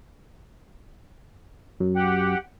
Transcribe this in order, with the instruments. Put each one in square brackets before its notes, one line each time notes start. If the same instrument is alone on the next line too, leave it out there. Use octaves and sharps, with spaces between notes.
[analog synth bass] F#2
[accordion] G4 F#5 G5